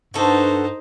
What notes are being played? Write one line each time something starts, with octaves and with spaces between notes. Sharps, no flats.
G2 D#4 F#4 A4 C5